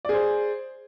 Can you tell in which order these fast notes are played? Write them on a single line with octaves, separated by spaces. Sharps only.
D5 G#4 C5